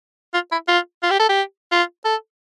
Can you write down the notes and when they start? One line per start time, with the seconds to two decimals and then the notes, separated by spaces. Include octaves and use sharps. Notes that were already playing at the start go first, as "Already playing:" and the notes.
0.34 F4
0.52 E4
0.68 F4
1.03 F4
1.11 G4
1.19 A4
1.29 G4
1.72 F4
2.05 A4